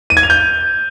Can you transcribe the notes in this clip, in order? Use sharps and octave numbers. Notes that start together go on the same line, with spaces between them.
D#7
G#6
F7
G6